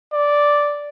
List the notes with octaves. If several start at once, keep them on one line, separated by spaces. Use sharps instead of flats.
D5